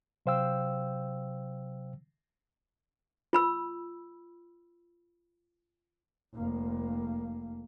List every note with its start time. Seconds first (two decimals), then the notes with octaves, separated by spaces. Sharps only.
0.26 C3 F#3 C5 F5 G5 E6
3.33 F4 B5 E6
6.34 F1 A#3